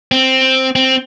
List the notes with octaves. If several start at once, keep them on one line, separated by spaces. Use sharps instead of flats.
C4
C4